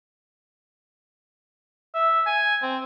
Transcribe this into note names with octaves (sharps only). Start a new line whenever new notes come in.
E5
G#5
C4